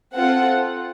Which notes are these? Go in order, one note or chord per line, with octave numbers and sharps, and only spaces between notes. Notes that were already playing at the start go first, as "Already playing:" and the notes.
C4 F4 A4 F#5